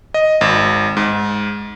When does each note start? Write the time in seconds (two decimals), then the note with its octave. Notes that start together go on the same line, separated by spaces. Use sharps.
0.14 D#5
0.41 G#1
0.97 G#2